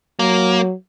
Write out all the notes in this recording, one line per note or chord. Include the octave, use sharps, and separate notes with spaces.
F#3 A#3